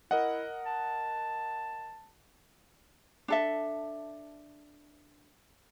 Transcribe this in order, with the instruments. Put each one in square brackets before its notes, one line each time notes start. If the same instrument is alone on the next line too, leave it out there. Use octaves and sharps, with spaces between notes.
[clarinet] E4 [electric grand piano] A#4 D#5 F#5
[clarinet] A5
[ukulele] D4 A4 E5